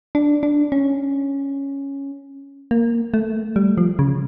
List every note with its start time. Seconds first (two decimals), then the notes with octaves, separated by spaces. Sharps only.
0.15 D4
0.43 D4
0.72 C#4
2.71 A#3
3.14 A3
3.56 G3
3.78 F3
3.99 C#3